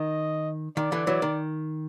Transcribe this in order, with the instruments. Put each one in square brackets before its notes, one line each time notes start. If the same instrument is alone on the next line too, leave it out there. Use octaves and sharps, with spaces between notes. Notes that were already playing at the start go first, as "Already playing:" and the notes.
Already playing: [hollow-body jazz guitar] D#3 [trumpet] D#5
[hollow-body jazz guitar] D#3 [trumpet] D5
[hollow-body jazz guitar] D3 E3
E3 F#3
D#3